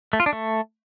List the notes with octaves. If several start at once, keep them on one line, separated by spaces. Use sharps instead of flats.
A3
F4
D4
A3